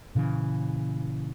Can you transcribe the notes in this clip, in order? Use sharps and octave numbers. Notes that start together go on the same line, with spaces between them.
A#2 C#3 E3